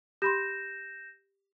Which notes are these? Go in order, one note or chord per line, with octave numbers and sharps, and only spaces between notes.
G4 B5 C6 G6 A#6 E7